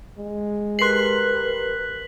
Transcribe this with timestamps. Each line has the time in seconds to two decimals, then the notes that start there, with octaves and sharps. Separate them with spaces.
0.18 G#3
0.79 G4 A#4 B4 C6 F#6 B6 C7 F#7